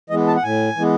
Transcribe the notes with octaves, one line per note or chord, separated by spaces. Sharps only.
E3 G#3 B3 D#5
A5
F#5
A2 G#5
E3 G#3 B3